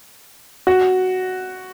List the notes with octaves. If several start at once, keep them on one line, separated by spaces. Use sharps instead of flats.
F#4